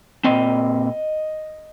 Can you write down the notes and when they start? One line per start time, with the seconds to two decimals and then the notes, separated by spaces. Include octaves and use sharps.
0.24 A#2 G3 C4 D#5